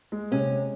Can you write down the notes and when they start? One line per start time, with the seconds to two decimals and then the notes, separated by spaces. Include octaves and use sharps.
0.12 G#3
0.31 C3 C#4
0.51 G#3